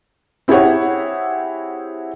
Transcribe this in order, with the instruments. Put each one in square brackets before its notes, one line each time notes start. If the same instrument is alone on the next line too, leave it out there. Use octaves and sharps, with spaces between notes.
[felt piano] C4 E4 G4 G#4 C#5 F#5